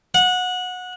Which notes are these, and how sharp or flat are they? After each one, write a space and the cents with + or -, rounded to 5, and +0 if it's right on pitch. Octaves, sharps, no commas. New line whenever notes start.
F#5 -20